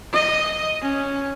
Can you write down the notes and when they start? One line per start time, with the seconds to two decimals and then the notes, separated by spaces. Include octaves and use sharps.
0.13 D#5
0.82 C#4